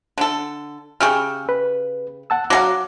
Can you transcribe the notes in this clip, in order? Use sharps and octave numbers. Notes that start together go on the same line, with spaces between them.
D3 A4
C#3 G4 G#4 C#6 E6 F6
B4
F#5 A5 E6
F#3 A4 F5 F#5 D6